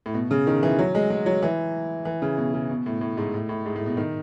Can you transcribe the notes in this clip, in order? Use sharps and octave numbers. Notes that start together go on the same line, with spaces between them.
A2
B2
C#3
D#3
E3
F#3
G#3
G#3
F#3
E3
E3
C#3
B2
C#3
B2
A2
A2
G#2
A2
A2
G#2
A2
B2
D#3